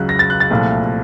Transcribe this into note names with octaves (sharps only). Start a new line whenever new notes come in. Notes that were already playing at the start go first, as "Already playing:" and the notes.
Already playing: C#2 C#3 F#3 F#6
A#6
A6
F#6
A6
C2 A#2 F3 A3